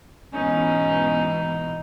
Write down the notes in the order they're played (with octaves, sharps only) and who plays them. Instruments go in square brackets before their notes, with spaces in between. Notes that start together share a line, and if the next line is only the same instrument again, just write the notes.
[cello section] G#2 B2 E3 [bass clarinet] C#4 [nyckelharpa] D#4